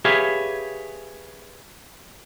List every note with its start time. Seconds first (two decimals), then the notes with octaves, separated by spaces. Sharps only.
0.05 G4 G#4 B4 C#5 E5 F5